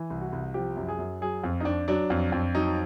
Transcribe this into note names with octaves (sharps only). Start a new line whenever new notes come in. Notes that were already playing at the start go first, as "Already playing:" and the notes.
Already playing: E3
C2
F#4
C2
F3 G4
F#2
G#4
F#2
F#3 G#4
F2
D#4
F2 D4
F#3 D4
F2
F2
F#3 D#4